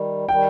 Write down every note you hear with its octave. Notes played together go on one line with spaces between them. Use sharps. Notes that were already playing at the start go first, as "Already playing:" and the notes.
Already playing: D#3 G3
D#3 G3 G5